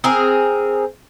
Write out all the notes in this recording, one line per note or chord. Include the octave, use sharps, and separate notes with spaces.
C4 G#4 A#4